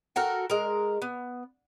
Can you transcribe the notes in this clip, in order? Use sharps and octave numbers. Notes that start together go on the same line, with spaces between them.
F#4 A4 A#4 F#5
G#3 A#4
B3